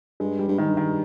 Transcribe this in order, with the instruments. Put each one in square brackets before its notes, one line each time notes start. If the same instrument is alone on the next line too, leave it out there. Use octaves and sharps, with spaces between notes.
[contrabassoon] G2 [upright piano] G#3
[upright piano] G3
[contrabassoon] G2
[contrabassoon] G#2 [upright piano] D#3
[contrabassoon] G2
[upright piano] D#3